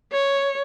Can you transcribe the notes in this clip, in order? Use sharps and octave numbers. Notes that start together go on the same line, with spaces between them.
C#5